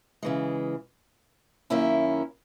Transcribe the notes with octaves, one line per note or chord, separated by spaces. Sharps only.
C#3 E3 G#3
F#2 D#3 A#3 C#4 E4